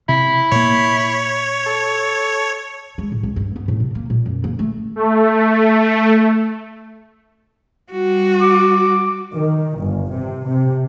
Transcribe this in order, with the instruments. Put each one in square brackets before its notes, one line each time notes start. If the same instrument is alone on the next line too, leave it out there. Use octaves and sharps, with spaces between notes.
[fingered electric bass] C3 [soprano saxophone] E4
[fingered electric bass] A#2 A#3 [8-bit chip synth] C#5
[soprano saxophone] A4
[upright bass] G#3
A2
C#2
G2
B3
A2
C3
A#3
A#2
F#2
A#3
A3
[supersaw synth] A3
[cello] G3 F#4
[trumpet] D6
[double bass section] D#3
G1
C3
C3